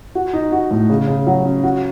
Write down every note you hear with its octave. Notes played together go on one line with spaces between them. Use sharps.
F#4
D#4
F#4
A2
C#3
C#3
F#3
C#4
F#4